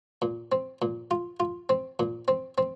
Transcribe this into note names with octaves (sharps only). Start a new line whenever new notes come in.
A#2
C4
A#2
F4
F4
C4
A#2
C4
C4